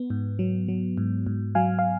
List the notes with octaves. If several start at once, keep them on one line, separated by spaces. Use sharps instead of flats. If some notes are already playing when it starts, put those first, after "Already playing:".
Already playing: B3
G#2
F#3
F#3
G#2
G#2
F#3 F5 G#5
F5